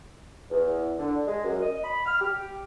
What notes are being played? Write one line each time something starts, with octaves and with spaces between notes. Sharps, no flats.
E2
D3
G#3
F#2
D#5
B5
F6
G4